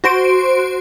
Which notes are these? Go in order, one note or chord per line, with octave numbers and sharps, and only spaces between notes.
F#4 C5 C6 D7